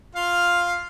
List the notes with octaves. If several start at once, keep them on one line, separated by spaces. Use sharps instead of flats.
F4 F5